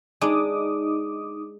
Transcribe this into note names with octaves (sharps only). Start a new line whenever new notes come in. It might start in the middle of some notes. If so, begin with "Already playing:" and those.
G#3 D4 D#4 D6 D#6